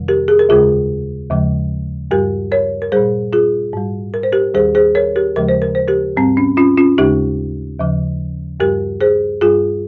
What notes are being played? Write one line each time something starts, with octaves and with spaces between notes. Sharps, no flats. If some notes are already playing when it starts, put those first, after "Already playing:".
Already playing: F2 C3 D#3 G3
G4 A#4
G#4
A#4
D#2 C#3 G#3 F4 G#4
D#2 C#3 F3 G#3
G2 G3 G4 A#4
A#4 C#5
A#4
A#2 G3 G#4 C5
F4 G#4
G#2 G3
A#4
C5
G4 A#4
D#2 D#3 G3 G#4 C5
G#4 C5
A#4 C#5
G4 A#4
D#2 C#3 F3 G#3 A#4
C5
A#4
C5
G4 A#4
G#2 G3 C4
C#4
C#4 F4
C#4 F4
D#2 C#3 G#3 D#4 G4
D#2 C#3 F3
G2 G3 G4 A#4
G#4 C5
G2 G3 F4 G#4